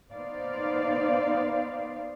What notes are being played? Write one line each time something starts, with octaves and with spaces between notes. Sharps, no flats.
B3 D#4 C5 D5 F5